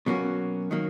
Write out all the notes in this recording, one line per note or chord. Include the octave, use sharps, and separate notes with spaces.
B2 F#3 A#3 C#4 F#4
D#3 F#3 A#3